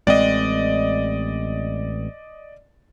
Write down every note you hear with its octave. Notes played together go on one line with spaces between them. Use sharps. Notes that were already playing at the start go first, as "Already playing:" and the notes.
A1 G#3 C4 D5 D#5